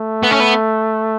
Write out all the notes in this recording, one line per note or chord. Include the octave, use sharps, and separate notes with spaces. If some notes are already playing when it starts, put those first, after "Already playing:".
Already playing: A3
B3
C#4
B3